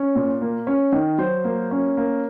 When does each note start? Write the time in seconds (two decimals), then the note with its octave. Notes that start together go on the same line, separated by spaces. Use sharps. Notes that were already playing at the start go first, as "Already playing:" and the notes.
Already playing: C#4
0.15 A#2
0.41 A#3
0.67 C#4
0.92 D#3
1.18 F#3 C5
1.44 A#3
1.71 C#4
1.97 A#3